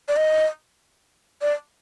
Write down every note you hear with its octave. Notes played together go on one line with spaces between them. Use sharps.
D5
D#5
D5